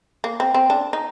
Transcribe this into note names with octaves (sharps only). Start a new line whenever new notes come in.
A#3
C4
C4
D4
D#4